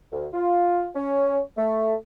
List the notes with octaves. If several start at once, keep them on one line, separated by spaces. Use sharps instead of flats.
D2
F4
C#4
A3